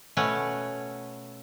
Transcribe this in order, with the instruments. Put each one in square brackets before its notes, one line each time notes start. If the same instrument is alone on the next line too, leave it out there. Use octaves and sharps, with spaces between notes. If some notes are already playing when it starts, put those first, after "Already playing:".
[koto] B2 A3 C#4 B4 C#5